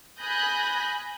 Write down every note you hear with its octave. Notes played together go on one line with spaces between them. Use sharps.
G#5 B5 D#6 F#6 G6 A#6